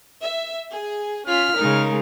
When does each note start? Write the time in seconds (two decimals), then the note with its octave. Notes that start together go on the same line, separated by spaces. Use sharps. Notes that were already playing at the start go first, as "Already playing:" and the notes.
0.23 E5
0.72 G#4
1.27 C#4 F4 F6 B6
1.57 C#3 G#3 D#4 A#4